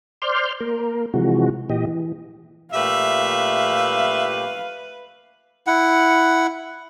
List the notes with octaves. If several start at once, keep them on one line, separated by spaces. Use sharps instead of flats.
C5 D5 C6 F6 G6
A#3 A#4
C3 E3 F3 G#3 F#4
A#2 E3 G4 D#5
E3
A#2 A3 G4 B4 E5 F5
E4 F#5